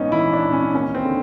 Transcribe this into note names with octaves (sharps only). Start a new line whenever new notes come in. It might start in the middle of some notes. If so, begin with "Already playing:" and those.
Already playing: A#1 G#2 B3 C#4 D#4
E3 E4
D4
A#1
C#4
D#2 C#4
C4
D3